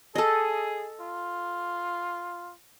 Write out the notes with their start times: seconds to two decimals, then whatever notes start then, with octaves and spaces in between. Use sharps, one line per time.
0.15 G#4 A4 D#5
1.01 F4